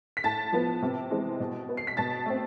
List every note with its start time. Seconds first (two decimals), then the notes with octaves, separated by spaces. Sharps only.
0.17 B6
0.24 A2 A5 A6
0.52 F3 B3
0.82 C3
1.11 E3 G#3 C4
1.40 B2
1.69 B3
1.77 C7
1.87 B6
1.97 B2 A5 A6
2.26 A3 C4